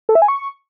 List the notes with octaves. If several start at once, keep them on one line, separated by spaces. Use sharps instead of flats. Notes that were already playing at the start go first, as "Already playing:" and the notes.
A4
E5
G#5
C#6